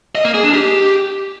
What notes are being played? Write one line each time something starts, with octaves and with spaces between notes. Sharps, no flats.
D#5
A#3
G#4
D4
G4